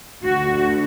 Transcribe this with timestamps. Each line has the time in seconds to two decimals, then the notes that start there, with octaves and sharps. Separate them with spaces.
0.23 D2 D3 A3 F#4